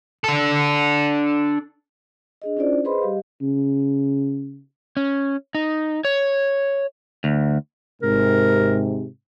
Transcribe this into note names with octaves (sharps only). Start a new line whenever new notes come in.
D4 A4
D4 G#4 D#5
C#4 D4 E4 F4 C5 D5
G#4 B4 C5 D#5 B5 C6
G3 G4 D#5 F5
C#3
C#4
D#4
C#5
D2
G#2 C3 A#4